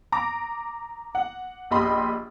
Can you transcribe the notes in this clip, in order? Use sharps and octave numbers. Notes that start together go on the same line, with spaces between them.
A#5 D6 A#6
F#5
A#1 G4 D#5 B5 C6